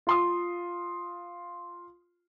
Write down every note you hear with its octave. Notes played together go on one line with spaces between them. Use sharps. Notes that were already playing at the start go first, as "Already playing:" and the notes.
F4 C6 D#6